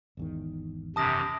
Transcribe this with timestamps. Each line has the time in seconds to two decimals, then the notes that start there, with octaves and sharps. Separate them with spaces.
0.17 G#1 E2 D#3
0.96 F#2 C3 A5 D#6 A#6